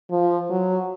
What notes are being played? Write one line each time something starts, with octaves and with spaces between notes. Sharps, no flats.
F3
F#3